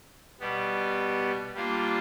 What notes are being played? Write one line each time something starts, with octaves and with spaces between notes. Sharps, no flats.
B2 G3 B3
G3 A#3 D4 F4